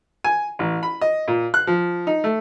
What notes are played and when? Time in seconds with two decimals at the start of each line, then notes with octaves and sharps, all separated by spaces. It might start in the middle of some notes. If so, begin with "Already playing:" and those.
0.24 G#5
0.59 A1
0.83 B5
1.01 D#5
1.28 A#2
1.54 F#6
1.67 F3
2.07 D#4
2.24 A3